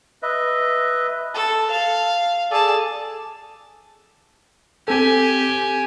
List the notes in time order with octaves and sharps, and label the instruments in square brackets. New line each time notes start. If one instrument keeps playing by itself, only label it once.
[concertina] B4 D#5 E5
[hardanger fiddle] A4 [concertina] A5
[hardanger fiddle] F5
[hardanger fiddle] G#4 A5 [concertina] A4 D5
[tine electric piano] C4 A4 [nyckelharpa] G4 G#5